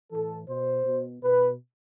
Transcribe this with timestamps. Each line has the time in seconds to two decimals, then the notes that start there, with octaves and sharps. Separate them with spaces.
0.11 A2 E3 A4
0.48 B2 C5
0.86 B2
1.23 B2 B4